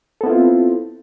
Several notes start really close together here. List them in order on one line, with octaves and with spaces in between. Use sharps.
A4 B3 E4 F4 C4